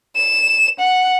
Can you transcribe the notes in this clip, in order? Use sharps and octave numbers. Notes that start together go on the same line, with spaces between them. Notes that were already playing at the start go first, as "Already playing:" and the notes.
E7
F#5